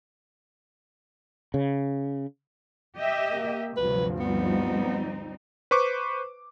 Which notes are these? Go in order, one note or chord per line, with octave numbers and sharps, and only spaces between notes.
C#3
G4 D#5 E5
A#3
D2 G2 C3 F3 F#3 B4
G3 B3 C4 D#4
B4 C5 C#6 D6